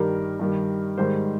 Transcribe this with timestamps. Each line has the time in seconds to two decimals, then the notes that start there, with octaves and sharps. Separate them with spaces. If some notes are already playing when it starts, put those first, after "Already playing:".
Already playing: G2 D#3 G3 A#4
0.39 G2 D#3 G3
0.97 G#2 D#3 G3 C5